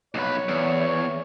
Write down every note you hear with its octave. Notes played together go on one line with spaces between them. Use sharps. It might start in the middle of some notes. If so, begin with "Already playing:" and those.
B1 B4 C#5
E2